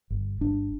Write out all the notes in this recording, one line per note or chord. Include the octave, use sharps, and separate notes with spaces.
G1
G1 D4